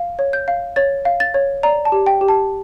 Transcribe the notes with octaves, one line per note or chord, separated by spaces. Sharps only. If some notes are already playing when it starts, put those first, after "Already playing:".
Already playing: F5
C#5
G6
F5
C#5 A6
F5
A6
C#5
D5 A#5
A5
G4
G5
G4
A5